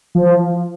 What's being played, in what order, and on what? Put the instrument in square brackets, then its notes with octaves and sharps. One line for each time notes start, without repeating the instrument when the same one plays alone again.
[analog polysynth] F3